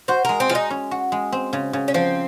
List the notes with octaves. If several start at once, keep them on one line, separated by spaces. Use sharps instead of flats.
F#4 C5
G#3 A#4
C4
G#3 F4
D#4
C#4
F#4
G#3
C4
C#3
C#3
C#4
F3 C4